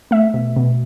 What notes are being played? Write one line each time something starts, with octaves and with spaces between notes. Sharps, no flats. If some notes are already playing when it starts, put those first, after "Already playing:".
A3 E5
B2
B2